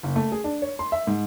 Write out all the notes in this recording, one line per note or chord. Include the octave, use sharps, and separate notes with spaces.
F#1
A3
G#4
D4
C#5
C6
E5
G#2